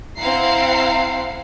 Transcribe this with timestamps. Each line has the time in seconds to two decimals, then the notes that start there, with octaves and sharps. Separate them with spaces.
0.18 C4 E4 F5 F#5 A#5 C7